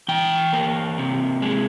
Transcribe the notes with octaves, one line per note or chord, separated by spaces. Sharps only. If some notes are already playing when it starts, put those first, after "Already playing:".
E3 G5
A#3
C3
G#3